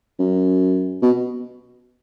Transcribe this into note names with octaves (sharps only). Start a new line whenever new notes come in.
F#2
B2